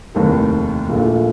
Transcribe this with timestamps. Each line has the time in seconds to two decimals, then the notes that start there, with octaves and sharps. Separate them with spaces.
0.15 F1 D#2 D#3
0.88 A#1 A#2 A3